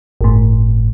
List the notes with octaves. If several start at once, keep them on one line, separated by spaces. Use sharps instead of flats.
G1 A2